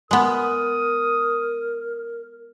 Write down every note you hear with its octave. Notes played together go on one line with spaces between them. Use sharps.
G#3 B3 A#4 D#6